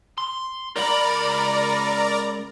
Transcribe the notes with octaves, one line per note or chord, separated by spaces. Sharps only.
C6
C#2 A#4 D5 A#5 B5